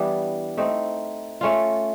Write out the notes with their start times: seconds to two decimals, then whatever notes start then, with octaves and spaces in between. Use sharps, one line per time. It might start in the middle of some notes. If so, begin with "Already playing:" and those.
Already playing: E3 G3 B3 D4
0.57 A3 C4 D#4
1.41 A3 C#4 F4